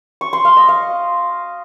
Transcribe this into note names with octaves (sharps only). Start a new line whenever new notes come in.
C#6
C6
F5
D#5
F5